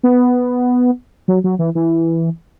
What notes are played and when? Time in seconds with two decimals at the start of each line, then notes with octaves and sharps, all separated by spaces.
0.03 B3
1.28 F#3
1.44 F#3
1.59 E3
1.75 E3